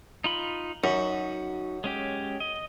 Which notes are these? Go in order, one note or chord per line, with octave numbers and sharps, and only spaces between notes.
D#4 F4 B5
F#2 D#4 F#4
G#3 C#4 G4
D#5